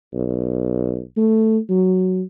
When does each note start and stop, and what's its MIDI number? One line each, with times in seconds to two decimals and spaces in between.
0.14 1.01 35
1.17 1.58 57
1.69 2.22 54